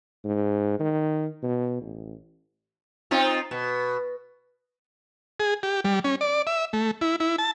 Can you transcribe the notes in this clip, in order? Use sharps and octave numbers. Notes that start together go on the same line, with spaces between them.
G#2
D#3
B2
A1
C4 D#4 F4
B2
G#4
G4
G3
C#4
D5
E5
A3
E4
E4
A5